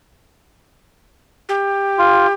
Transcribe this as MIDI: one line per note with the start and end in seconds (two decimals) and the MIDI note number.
1.49 2.33 67
1.98 2.27 65